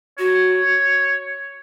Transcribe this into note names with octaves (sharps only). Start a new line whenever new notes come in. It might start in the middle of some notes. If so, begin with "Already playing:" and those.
F#4 C#5